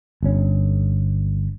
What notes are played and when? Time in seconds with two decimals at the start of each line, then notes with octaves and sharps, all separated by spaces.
0.23 G1 C#4